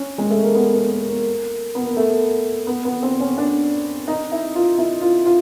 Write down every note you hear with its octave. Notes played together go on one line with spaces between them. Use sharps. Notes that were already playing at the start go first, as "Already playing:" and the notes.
Already playing: C#4
G#3
A3
A#3
B3
B3
A#3
A#3
B3
A#3
A3
B3
B3
C4
C#4
D4
D#4
E4
F4
E4
F4
F4